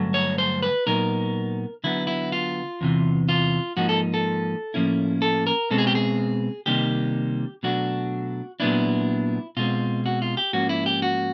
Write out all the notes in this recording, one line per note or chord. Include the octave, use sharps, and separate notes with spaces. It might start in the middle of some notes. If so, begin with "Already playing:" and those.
Already playing: G2 D3 F#3 A3
C#5
C5
B4
A#2 F#3 B3 D#4 A#4
D3 F#3 B3 E4
E4
F4
E2 C3 E3
F4
G#2 F3 A#3 D#4 F#4
A4
A4
A2 F3 A#3 C#4 E4
A4
A#4
B2 G#3 C4 A4
G#4
G4
G#4
C3 D#3 G3 A#3 D#4 G4
B2 F#3 A3 D4 F#4
A#2 F#3 B3 D4 E4
B2 G#3 C4 F4
F#4
F4
G4
G#2 F3 A#3 C#4 F#4
E4
G4
F#4